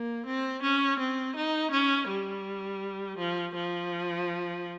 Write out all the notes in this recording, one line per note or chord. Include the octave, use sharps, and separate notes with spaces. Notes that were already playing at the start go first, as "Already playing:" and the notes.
Already playing: A#3
C4
C#4
C4
D#4
C#4
G3
F3
F3